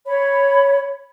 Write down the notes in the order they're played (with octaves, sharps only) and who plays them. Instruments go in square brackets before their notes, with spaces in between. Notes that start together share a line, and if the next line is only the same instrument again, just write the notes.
[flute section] C#5 B5